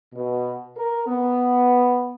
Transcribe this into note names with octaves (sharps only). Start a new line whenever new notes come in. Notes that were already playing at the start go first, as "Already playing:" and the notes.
B2
A#4
B3